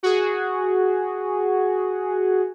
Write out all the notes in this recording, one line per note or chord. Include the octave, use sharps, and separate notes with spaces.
F#4 G#4